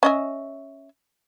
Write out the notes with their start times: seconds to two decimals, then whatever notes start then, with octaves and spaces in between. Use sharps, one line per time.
0.03 C#4 D#5 E5